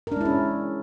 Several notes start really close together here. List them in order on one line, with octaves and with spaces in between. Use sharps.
A#4 D4 G#3 E4 C#4